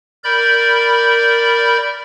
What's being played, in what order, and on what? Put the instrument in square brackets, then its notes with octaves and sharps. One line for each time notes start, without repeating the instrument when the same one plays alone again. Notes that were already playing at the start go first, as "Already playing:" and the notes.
[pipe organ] A#4 D5 B5 G6